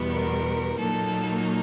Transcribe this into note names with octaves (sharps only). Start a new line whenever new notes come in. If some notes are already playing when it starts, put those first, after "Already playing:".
Already playing: E2 B2 G3 B3
A#4
A#2 F#3 A#3 D#4 A4